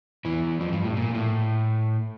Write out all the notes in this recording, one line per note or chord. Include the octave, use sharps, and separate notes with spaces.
E2 E3
F2 F3
G2 G3
A2
A#2
A2